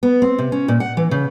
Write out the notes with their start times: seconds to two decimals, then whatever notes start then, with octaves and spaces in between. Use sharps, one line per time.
0.03 B3
0.22 C4
0.38 C3
0.52 C#4
0.68 A#2
0.80 F#5
0.97 E3
1.11 C#3